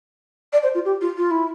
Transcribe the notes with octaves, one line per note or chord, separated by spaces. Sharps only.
D5
C5
F4
G4
F4
F4
E4